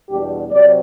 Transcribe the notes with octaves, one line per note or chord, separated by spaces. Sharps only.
E2 B2 G3 B3 D4 G4
C3 F#3 C4 D5